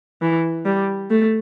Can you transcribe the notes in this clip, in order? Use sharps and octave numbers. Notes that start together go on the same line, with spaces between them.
E3
G3
A3